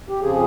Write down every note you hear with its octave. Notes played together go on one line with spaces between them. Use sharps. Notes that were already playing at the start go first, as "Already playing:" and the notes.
G4
F2 C#3 F3 G#4